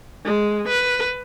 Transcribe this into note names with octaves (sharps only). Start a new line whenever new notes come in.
G#3
B4